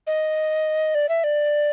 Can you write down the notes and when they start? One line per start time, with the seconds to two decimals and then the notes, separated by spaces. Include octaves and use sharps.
0.07 D#5
0.95 D5
1.09 E5
1.24 D5